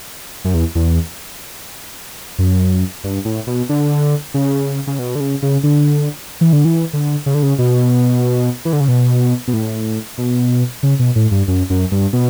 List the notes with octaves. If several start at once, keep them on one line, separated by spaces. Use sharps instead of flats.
F#2
E2
E2
F#2
G2
A2
B2
D3
C#3
C#3
B2
D3
C#3
C#3
D3
E3
D3
E3
D3
C#3
D3
C#3
B2
E3
D3
C#3
B2
B2
A2
B2
C#3
B2
A2
G2
F#2
F#2
G2
B2